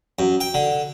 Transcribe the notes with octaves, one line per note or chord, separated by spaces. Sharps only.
F#2
G5
D3